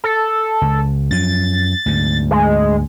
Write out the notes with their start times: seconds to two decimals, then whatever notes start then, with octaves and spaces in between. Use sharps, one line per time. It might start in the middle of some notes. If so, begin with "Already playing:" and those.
0.04 A4
0.62 C#2
1.11 F#2 F3 A6
1.86 D2 G#2
2.31 G#3